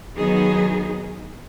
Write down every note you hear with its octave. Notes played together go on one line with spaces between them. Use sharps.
D#3 F#3 B3 D#4 G#4